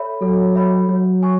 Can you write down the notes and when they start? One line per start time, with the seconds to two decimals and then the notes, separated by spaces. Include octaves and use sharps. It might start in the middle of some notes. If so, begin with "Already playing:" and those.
Already playing: A4 C#5 E5 B5
0.21 F#3 A4
0.55 C#5 E5 B5
0.89 F#3 C#5
1.23 G#5 C#6